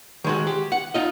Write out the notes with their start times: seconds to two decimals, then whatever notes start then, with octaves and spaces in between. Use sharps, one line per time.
0.24 D#3 G#3 F#4
0.47 G4
0.72 F#5
0.94 D#4 F4 D#5